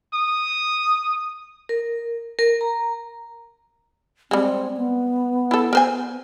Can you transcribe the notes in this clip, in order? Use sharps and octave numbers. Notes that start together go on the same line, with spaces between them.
D#6
A#4
A#4
A#5
G3 G#3 C4
B3
E4 A4
A#4 C5 G#5